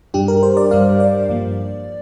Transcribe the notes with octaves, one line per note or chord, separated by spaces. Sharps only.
G2 G3 D4 G4
A#4
C5
D5
G2 G3 D4 F5
D5
G2 F3 A#3